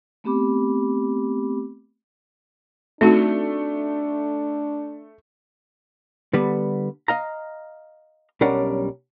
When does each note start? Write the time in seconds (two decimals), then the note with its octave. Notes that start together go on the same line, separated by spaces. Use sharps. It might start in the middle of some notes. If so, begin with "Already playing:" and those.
0.24 A3 B3 C4 G4 B5 D6
3.01 A3 C4 D4 D#4 F#4
6.33 D3 G3 B3
7.08 D#5 F5 A#5
8.41 B1 G3 C#4 D4 A#4 F#5